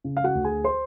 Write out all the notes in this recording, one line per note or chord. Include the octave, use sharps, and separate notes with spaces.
C#3
F5
F#4 F#5
D2
G#4 G#5
C5 C6